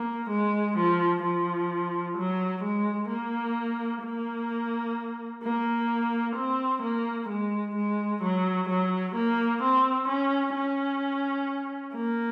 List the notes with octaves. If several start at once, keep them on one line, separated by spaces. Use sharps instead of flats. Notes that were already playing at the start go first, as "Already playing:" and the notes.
Already playing: A#3
G#3
F3
F3
F#3
G#3
A#3
A#3
A#3
C4
A#3
G#3
G#3
F#3
F#3
A#3
C4
C#4
C#4
A#3